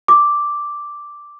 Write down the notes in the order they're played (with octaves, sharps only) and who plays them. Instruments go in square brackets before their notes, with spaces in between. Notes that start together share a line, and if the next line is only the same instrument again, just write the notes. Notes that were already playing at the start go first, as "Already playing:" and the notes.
[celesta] D6